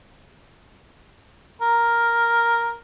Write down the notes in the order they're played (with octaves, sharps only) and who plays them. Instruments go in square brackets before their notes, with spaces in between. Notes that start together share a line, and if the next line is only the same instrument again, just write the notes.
[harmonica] A#4